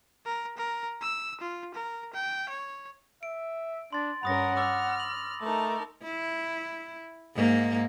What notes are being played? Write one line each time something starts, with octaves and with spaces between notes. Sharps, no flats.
A#4
A#4
E6
F4
A#4
G5
C#5
E5 D7
D4 C6 A6
G2 C#4 A#4 F#5 B5 D#6 A#6
D6 E6 F6 A6
F#7
A3 D#4 A#4 A5
E4
G#2 A#3